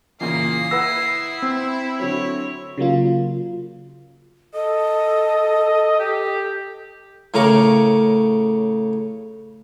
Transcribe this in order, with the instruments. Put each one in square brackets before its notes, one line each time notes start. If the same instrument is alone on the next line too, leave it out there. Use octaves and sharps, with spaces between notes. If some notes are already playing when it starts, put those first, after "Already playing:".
[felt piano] A#2 C#3 E3 [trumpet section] A#3 [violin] D#6 C7
[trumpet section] E4 [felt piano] B4 F#5 A#6 [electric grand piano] E6
[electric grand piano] C4
[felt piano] D3 F#3 [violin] C#5
[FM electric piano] C#3 F#3 A#3 F4
[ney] A4 [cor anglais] D#5
[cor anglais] G4
[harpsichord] A2 C#3 A#4 C#6 D6